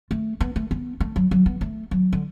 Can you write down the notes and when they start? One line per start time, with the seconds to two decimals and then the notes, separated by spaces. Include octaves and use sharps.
0.11 A3
0.40 B3
0.56 A3
0.71 B3
1.00 A3
1.16 F#3
1.31 F#3
1.46 B3
1.61 A3
1.91 F#3
2.13 D3